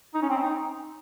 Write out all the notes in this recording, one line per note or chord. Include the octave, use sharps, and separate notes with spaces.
D#4
C#4
C4
C#4
D#4